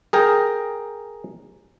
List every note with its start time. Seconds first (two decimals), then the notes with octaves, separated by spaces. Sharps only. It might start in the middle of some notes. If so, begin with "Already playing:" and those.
0.13 G#4 A#4 G5